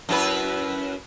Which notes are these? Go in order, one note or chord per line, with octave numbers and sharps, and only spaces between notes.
F#2 E4 B4